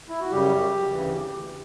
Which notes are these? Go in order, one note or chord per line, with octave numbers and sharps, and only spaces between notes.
E4
F#4
F#2 C#3 G3 G4
D2 C#3 E3